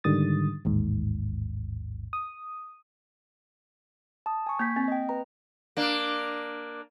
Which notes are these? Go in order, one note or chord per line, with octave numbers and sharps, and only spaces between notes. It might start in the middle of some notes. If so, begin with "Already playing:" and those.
G#2 D3 D#3 G3 D#6 A6
A1 D#2 G#2
D#6
A5 D#6
G#5 C#6
A#3 G6 G#6 B6
C4
D#5 G5
B4 A#5
A#3 D4